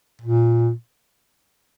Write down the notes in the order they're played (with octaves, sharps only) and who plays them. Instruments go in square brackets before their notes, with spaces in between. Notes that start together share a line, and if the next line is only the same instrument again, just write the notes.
[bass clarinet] A#2